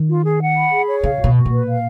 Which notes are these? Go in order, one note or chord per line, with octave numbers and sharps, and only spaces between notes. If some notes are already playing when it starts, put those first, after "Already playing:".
Already playing: D#3
F4
G#4
F#5
B5
G#4
C#5
C#3 F5
B2 F#4
F#4
A#2 B4
F5